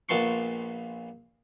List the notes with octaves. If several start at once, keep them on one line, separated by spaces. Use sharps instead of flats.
A#1 A#2 B3 A5 C6 C#6